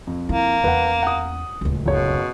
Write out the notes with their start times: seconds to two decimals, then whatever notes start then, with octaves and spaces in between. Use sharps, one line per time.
0.07 F2
0.29 A#3 E4
0.64 E2 C#4 B4 F#5
1.03 F#5 D#6
1.61 D1 C#2
1.86 F#1 B2 C#5